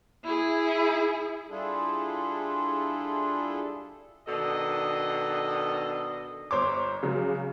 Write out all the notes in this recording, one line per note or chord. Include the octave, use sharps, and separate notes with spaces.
E4 G#4
G3 D4 E4 F4 G#4 A4
B2 D#3 D4 A4 D#5
G1 C5 C#5 C6 D6
C#3 F#3 G#3